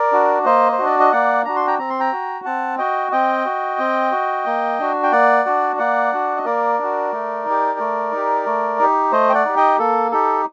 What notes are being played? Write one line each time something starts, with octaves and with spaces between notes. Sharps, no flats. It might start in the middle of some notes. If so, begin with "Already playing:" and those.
Already playing: A#4 D5
D4 F#4
A#3 C5 D#5
C5
D4 F#4
D5
D#5
A#3 D5 F#5
D4 F#4 A#5
C6
G5 A#5
C4 A#5
C6
G5 A#5
F#4
C4 F#5 A5
F#4 D#5 G5
C4 D#5 G5
F#4
C4
F#4
A#3
D4 F#4
G5
A#3 D5 F#5
D4 F#4
A#3 D5 F#5
D4 F#4
D#5
A#3 A#4 D5
D4 F#4
A3
D#4
G4
A3
D#4 G4
A3
D#4 G4
A3 C5 D#5
G5
D5 F#5
D#4 G4
D#5 G5
A#3 A4
D#4 G4 A4